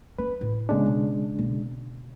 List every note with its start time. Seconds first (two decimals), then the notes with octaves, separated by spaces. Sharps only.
0.19 C#4 B4
0.41 A2
0.69 C#3 G#3 B3 C4 D4
0.86 B2
1.39 B2 D3